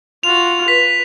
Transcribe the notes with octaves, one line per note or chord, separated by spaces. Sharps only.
F4 F#4 F7
B4 B6